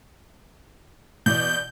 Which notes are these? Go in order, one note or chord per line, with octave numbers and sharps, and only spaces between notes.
B2 E3 D5 G6